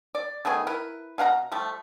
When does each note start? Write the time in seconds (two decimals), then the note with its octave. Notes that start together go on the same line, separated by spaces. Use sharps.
0.15 D5
0.45 D#3 A3 B3 G#4
0.67 E4 A#4 B4
1.18 B2 F5 F#5 A#5
1.52 F3 G3 A3